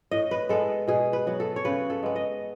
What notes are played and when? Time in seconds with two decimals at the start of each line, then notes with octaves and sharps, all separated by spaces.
0.11 A2 D#5
0.31 B4
0.49 G#3 B3 A4
0.88 B2 G#4
1.13 B4
1.27 F#3 B3
1.40 A4
1.56 C#5
1.65 C#3 B4
1.90 A4
2.03 G#3 B3
2.16 D#5